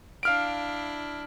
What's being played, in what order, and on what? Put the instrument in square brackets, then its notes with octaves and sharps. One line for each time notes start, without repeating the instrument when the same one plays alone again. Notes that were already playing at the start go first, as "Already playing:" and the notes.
[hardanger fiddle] D4 E4 [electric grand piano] F5 F6 D7